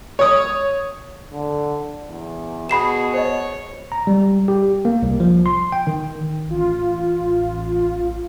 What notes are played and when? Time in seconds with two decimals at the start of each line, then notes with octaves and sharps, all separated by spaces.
0.19 C#5 D#6
1.33 D3
2.08 E2
2.69 B2 F#4 G#4 B5 C7 E7
3.14 C5 C#5 D#5
3.92 A#5
4.07 G3
4.48 G4
4.85 A#3
5.02 C2
5.20 F3
5.46 C6
5.72 G5
5.87 D#3
6.47 A1 F4